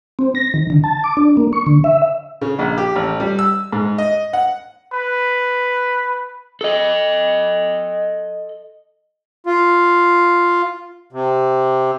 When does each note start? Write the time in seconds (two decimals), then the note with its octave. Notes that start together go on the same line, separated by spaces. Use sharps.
0.19 C4
0.35 A#6
0.54 D#3
0.70 D3
0.84 A5
1.04 D6
1.17 D4
1.37 A#3
1.53 C#6
1.67 D3
1.84 E5
2.41 C#3
2.59 A#1
2.78 G4
2.96 A1
3.20 G3
3.39 E6
3.73 G#2
3.98 D#5
4.33 F#5
4.93 B4
6.61 A4 D#5
9.46 F4
11.13 C3